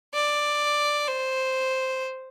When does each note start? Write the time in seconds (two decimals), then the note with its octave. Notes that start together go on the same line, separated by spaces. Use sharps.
0.14 D5
1.07 C5